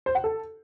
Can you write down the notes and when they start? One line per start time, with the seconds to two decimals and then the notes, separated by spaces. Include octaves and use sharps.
0.06 C5
0.15 F#5
0.24 A4